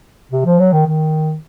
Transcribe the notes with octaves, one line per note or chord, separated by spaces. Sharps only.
C3
F3
F#3
D#3
D#3